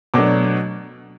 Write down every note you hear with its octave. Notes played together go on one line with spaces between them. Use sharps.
B2 F#3 A3 D4 D6